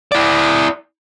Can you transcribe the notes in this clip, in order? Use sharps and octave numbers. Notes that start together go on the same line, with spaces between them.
E4 D5